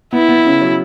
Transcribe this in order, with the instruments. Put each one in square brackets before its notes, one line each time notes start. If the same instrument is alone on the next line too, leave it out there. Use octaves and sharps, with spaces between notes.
[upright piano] B3 [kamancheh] E4
[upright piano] B3
C#3
F#3